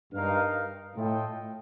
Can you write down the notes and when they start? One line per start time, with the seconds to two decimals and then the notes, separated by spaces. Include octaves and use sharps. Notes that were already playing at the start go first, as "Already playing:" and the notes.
0.13 G2 D#4 A#4 F5
0.96 A2 F4 A4 D#5 G5